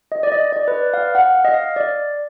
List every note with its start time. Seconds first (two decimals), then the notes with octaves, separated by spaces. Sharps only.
0.12 D#5
0.23 D5
0.32 D#5
0.53 D5
0.68 B4
0.74 D5
0.94 F5
1.15 F#5
1.35 F5
1.45 D#5
1.54 F5
1.76 D5